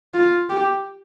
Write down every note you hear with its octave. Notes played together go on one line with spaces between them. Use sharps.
F4
G4